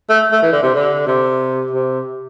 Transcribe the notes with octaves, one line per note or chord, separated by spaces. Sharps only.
A3
A3
E3
D3
C3
D3
C3
C3